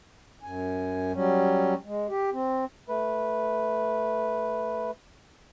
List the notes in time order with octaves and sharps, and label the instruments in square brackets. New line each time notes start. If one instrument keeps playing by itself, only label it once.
[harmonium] F#2 G#5
F#3 G3 C#4
G#3
G4
C4
[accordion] A3 B4